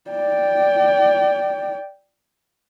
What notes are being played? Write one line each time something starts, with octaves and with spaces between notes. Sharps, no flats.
D5 G5